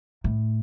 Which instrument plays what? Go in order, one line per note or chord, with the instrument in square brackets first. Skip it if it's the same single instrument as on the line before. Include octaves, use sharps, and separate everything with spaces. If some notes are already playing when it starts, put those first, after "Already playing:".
[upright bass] A2